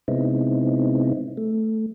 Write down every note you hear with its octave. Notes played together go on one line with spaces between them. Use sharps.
C3 G#3 B3 C4 D#4 E4
A3